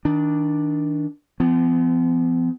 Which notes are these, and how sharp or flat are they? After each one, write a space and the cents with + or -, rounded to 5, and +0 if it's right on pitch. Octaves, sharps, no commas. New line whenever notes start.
D#3 +25 D4 +0
F3 -35 B3 +45